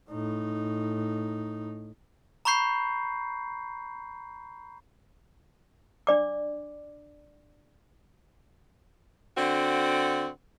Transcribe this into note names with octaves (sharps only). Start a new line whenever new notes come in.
A2 D#4
A#5 B5 C#6 G6 C7
D4 D5 D6
D3 C4 F#4